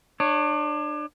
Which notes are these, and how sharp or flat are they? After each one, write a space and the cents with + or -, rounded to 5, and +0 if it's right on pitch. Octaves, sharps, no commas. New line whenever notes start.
D4 +30 C#5 +0